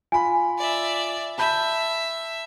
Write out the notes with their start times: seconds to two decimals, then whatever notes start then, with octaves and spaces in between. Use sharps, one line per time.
0.12 F4 G#5 B5
0.58 D5 E5
1.38 E5 A5 B5 G6